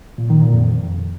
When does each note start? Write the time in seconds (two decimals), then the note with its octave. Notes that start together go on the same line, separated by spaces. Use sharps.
0.18 A#2
0.30 D#3
0.41 A#2
0.53 F2